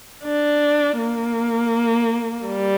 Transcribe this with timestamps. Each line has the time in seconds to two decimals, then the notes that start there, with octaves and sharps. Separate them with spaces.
0.23 D4
0.98 A#3
2.46 G3